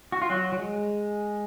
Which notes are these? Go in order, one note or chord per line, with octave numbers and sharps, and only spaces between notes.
F#4
F4
F#3 F#4
F#3
G#3